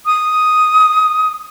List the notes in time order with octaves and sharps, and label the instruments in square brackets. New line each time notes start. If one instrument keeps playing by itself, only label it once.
[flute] D#6